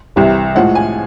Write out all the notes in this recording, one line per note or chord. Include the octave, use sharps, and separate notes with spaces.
C2 C3 E3 G3
A2 F3 G#3 F#5
G#5